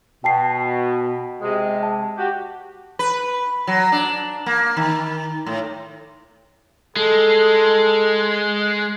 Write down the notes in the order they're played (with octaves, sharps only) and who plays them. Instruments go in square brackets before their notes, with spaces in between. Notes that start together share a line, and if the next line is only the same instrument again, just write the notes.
[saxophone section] B2 [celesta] G5 A5 C7
[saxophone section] C3 G#3
[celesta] A5
[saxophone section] F#4 G4
[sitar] B4
F#3
D4
A#3
D#3
A2
[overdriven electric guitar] G#3 [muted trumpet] A4